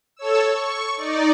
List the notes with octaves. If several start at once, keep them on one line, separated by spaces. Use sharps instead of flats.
A4 C#5 E6
C#6
D#4 D5